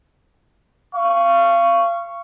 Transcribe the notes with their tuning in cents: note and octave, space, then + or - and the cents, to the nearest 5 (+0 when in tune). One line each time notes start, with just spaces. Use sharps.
F5 -25 C#6 +0